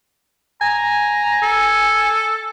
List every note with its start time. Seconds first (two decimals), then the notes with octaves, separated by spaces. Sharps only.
0.61 G#5 A#5
1.42 A4